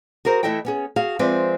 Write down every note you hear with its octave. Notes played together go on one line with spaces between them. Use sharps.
F#4 G#4 A#4 C5
E3 A3 E4 A4 D#5 G5
B3 C#4 G#4
F#4 G#4 F5
F3 G#3 C4 B4 D5 E5